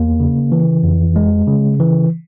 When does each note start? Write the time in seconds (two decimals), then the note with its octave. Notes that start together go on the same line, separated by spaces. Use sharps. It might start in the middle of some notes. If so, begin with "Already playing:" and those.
Already playing: E2 A#3
0.20 C#3
0.52 E3
0.83 F2
1.16 G#3
1.48 C#3
1.80 E3